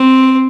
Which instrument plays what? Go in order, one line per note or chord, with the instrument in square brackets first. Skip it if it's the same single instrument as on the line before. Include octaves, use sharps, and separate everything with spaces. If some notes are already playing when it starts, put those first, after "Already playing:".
Already playing: [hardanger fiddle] C4